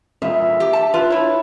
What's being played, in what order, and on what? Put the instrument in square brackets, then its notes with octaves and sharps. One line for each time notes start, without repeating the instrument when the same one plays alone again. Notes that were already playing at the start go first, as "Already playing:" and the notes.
[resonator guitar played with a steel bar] E2 A#2 [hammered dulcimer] E5
[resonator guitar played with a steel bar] G4
A5
F4 B4
E4 C#5